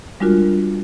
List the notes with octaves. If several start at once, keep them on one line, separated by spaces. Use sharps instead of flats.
G3 G#3 D4 F4 F#4 A#4